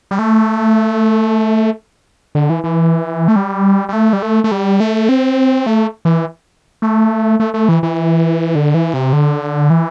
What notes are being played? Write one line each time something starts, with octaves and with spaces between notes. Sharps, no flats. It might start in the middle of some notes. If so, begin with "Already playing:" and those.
G3
A3
D3
E3
E3
A3
G3
G3
A3
G3
A3
A3
G3
A3
C4
A3
E3
A3
A3
A3
E3
E3
D3
E3
C3
D3
E3